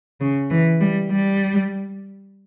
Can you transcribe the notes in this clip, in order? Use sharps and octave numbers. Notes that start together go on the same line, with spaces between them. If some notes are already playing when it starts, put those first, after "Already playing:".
C#3
E3
G3
G3